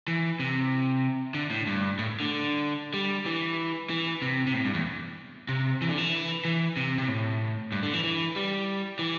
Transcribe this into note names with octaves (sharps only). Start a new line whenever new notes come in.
E3
C3
D3
A2
G2
A2
D3
G3
E3
E3
C3
C3
A2
G2
E2
C3
E3
D3
E3
E3
C3
C3
A2
G2
D3
E3
E3
G3
E3